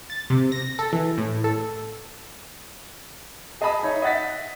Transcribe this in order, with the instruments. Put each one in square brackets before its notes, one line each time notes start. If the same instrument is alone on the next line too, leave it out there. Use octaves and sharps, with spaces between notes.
[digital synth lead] A6
C3
A#6
A4
E3
A2
A4
[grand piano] G#4 D#5 G#5 A5 B5 D#6
D#4 C#5 E5
D#5 E5 F#5 A6 B6